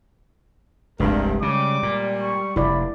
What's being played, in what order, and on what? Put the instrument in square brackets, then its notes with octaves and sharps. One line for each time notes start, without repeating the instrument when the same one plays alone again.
[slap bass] F1 C2 [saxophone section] G2 [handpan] G#3 [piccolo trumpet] A#4
[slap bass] C#3 [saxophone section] G3 [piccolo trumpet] D6
[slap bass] A#2
[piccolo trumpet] C#6
[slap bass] F1 [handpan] E4 D5 [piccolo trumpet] B5